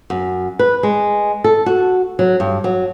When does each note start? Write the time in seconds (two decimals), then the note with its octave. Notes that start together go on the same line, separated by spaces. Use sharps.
0.10 F#2
0.59 B4
0.83 G#3
1.44 A4
1.66 F#4
2.19 F#3
2.40 G2
2.64 F#3